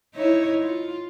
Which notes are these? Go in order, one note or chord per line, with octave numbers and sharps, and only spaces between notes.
D#4 E4 C#5
F4